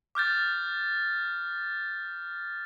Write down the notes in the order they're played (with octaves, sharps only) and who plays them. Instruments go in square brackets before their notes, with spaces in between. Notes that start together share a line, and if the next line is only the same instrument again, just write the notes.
[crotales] D6 F6 G6 A6